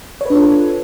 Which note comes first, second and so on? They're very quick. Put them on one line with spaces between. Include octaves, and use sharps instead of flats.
C#5 B4 D4 F4 A4